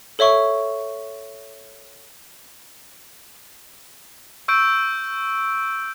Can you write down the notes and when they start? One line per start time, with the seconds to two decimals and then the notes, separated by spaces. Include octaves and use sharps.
0.19 A4 C#5 E5 C#6
4.48 C#6 E6 G6 D7